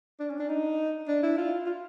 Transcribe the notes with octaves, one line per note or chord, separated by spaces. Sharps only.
D4
C#4
D4
D#4
D4
E4
F4
F4